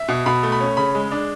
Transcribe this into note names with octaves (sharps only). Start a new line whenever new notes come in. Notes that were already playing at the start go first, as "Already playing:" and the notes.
Already playing: E5
B2
B2 B5
A3
B5
C#4
C#3 B5
G#3
D4